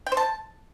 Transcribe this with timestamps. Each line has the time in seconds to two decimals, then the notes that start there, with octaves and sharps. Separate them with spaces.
0.06 G5
0.12 C5
0.17 A5